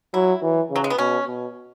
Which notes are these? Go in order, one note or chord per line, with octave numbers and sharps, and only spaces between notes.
F#3 E4
E3
C#3
F#3
G#3
B3
B2 C#4
B2